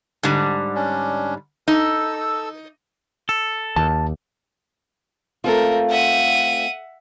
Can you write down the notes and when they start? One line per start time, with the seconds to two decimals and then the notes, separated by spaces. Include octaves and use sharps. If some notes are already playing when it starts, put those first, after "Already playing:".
0.23 G#2 D3 G3
0.75 C#4 D4
1.68 D#4 A4 E6
3.29 A4
3.76 D#2 A5
5.44 A3 C4 F4 A4 A#4
5.90 E5 F#5 D#7